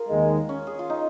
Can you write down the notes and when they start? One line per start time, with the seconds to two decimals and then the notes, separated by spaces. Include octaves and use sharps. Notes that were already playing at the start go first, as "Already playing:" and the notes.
Already playing: F4 G#4 A#4
0.09 D#2 D#3 G#3
0.49 C#4
0.67 G#4
0.79 F4
0.90 D#4